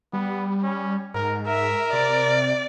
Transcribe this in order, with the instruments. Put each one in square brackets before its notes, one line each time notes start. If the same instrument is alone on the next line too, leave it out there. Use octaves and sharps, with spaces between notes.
[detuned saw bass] G3 [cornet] B3
[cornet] C#4
[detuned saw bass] G#2 [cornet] A#4
[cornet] A#4 [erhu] E5
[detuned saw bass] C3 [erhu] D5